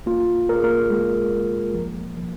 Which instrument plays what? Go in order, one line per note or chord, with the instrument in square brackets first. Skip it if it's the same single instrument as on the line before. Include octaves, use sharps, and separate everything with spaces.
[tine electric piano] A#3 F4 F5
A#3 A#4
G#4
A#3 A#4
G#3 A#3 G#4
A#3
F3
F3